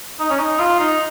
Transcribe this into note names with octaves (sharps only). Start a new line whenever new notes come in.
D#4
C#4
D#4
F4
D#4